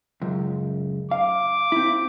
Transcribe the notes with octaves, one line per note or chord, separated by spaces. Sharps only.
C#2 F#2
F5 D6
C4 E4